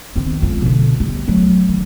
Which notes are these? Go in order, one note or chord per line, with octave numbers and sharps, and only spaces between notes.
D#3 C4
F2 G#3
B2 D3
G3
F#3 A3
D#3